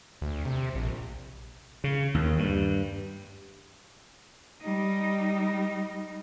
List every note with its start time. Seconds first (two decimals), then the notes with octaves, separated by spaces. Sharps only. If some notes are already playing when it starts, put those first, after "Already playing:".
0.22 D2
0.45 C3
0.75 A#1
1.84 C#3
2.14 D#2
2.38 G2
4.61 G3 D#4